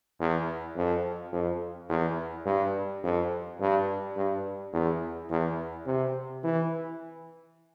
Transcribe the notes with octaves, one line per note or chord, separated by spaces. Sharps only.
E2
F2
F2
E2
G2
F2
G2
G2
E2
E2
C3
E3